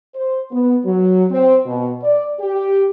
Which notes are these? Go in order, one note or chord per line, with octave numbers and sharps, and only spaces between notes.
C5
B3
F#3
C4
B2
D5
G4